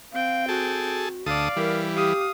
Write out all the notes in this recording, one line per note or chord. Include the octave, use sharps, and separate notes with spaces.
C4 F5 G5
F#4 G#4 A4
D2 A4 D5 F5 D#6
E3 G3 A#4
G4 F5 D#6